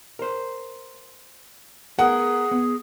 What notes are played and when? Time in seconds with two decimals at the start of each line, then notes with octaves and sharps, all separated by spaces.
0.19 A#4 C5
1.99 B3 G#4 A#4 F#5
2.51 B3